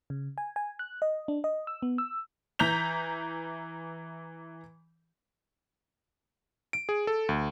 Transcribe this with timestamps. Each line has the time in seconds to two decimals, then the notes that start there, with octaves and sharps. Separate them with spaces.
0.10 C#3
0.38 G#5
0.56 G#5
0.79 F#6
1.02 D#5
1.28 D4
1.44 D#5
1.67 E6
1.82 B3
1.98 E6
2.59 E3 A#5 G6 B6 F7
6.73 D7
6.89 G#4
7.07 A4
7.29 D2